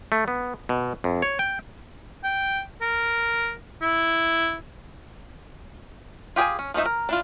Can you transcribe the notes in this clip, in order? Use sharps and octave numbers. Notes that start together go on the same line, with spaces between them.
A3
B3
B2
F2
C#5
G5
G5
A#4
E4
F4 G4 G#4 G5 G#5
C#4
F3 A3 D#4 E5
A#4
D4 E4 F4